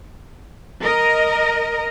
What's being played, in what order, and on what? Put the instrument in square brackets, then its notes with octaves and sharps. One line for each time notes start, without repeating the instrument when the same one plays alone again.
[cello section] A#4 D#5